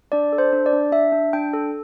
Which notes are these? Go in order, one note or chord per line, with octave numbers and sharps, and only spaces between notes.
D4 D5
A4
C5
D4
D5
D4
D4 E5
D4
D4 G5
A4